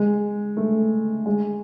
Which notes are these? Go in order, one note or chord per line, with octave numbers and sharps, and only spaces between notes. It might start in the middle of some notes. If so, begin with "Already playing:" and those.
Already playing: G#3
A3
G#3